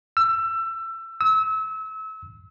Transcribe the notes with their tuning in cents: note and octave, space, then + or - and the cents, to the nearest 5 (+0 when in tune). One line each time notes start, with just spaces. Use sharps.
E6 +25
E6 -30